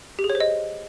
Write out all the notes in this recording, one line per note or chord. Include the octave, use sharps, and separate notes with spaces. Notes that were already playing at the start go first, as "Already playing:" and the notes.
G4
G#4
C#5
C5
D#5